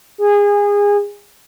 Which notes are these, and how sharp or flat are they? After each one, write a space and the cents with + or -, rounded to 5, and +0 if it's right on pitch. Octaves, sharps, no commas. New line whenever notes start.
G#4 -25